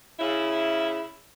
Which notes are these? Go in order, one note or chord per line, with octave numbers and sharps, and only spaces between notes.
C#3 E4